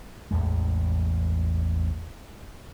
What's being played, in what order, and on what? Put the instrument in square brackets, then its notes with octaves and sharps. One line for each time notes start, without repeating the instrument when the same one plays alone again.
[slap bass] A1 E2 A2 G#3